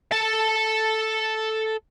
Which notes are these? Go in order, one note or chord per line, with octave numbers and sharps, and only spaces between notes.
A4 A5